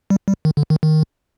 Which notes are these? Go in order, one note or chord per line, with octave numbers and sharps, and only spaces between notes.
G3
G3
D#3
D3
D#3
D#3